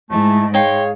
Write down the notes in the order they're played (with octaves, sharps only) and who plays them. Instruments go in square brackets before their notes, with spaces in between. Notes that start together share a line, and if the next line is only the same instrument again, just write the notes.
[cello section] G#2 [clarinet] A3 [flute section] E4 G#5 A5
[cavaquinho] D#4 G5 C6 [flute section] G#4 F5 [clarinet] C#5